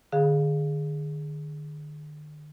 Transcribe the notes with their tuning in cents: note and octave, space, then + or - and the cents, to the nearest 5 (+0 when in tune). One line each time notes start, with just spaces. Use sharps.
D3 +45 G#4 +0 F5 +10